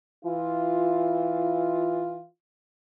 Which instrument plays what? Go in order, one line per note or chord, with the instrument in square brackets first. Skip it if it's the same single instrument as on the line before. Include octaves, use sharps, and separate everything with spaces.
[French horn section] E3 E4 F4